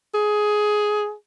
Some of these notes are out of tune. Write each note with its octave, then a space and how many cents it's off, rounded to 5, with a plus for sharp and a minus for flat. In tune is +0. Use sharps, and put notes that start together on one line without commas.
G#4 +10